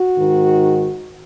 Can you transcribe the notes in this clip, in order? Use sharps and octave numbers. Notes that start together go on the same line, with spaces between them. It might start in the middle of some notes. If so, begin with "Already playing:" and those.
Already playing: F#4
G#2 D#3